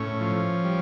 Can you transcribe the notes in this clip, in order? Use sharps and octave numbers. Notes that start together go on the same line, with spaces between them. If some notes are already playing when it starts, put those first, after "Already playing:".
Already playing: A2 C#4
F3
G3